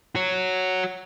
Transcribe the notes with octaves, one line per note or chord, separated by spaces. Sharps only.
F#4 C#5